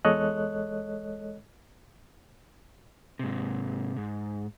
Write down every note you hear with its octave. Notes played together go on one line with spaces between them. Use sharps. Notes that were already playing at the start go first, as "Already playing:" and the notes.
E2 G#3 A4 C#5 D#5 F#6
G#2 C3
G#2